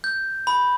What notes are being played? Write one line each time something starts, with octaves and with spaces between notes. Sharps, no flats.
G6
B5